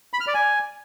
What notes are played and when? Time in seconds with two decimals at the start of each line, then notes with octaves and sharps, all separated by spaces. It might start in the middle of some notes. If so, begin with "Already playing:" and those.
0.14 B5
0.20 F6
0.27 D5
0.34 G#5